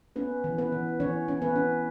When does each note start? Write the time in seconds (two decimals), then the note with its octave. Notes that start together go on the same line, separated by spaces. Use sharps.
0.16 B3 C#4 B4
0.44 E3
0.58 B3 B4
0.72 E3
1.00 E3 C#4 C#5
1.28 C#4
1.42 B3 B4
1.56 C#4